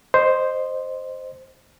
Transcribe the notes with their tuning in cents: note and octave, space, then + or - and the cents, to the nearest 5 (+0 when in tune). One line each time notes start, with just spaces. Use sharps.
C5 +0 D#5 -15